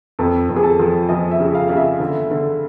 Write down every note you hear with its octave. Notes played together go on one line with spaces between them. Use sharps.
F2 A4
F2
G#4
A4
F3
F3 D#5
E5
C#3
F5
C#3 F5
E5
D3
D3